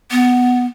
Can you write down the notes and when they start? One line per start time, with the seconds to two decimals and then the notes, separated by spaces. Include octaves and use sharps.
0.11 B3